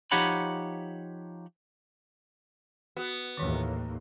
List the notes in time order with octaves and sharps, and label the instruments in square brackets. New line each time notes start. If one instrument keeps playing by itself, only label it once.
[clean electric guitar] F3 D#4 G4 C#5 F#5 B5
[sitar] B3 [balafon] F#4
[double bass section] D#2 A2 [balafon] D#3 E3